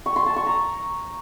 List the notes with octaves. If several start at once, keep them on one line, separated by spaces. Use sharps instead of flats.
C#6
C6
A5
C#6
A#5